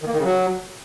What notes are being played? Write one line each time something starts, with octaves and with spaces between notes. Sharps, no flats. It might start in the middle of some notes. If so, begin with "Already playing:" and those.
D#3
A#3
D#3
C#3
F#3